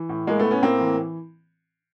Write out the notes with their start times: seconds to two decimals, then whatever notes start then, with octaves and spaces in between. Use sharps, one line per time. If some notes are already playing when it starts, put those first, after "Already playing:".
Already playing: E3
0.09 A2
0.27 A2 G#3 A#3
0.39 A3 B3
0.45 A2
0.51 B3 C#4
0.63 A2 A#3 C4
0.81 E3